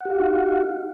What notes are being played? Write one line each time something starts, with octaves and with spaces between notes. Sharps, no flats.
D#4 F#4 G4 F5 F#5